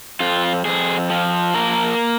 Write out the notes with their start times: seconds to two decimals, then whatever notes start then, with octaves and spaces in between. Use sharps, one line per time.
0.20 F2 F4
0.65 F2 G#4
1.10 F3
1.54 A#3 A#4